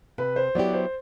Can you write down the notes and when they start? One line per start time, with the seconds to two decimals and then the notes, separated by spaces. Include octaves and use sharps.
0.18 C3 B4
0.36 C5
0.55 F#3 B3 E4 G4 D5
0.73 C5